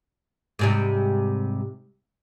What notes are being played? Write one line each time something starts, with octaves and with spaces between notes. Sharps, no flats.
G#2 C3 G3